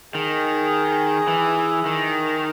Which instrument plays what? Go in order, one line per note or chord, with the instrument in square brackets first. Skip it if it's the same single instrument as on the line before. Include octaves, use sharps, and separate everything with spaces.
[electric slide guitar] D#3 [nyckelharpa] G#4
[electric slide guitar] E3
D#3